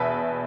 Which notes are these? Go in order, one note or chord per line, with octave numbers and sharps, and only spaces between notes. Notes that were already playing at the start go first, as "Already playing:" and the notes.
Already playing: E2 B2 B4 E5